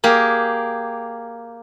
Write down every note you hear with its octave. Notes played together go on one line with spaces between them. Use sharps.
A#3 G4 G#4